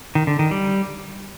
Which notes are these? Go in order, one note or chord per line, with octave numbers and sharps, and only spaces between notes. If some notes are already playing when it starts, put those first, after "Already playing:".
D#3
D3
D#3
G3